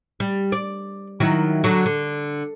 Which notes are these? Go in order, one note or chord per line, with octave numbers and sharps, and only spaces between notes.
G3
D5
D#3 F#3 E4
D3 F#3
D3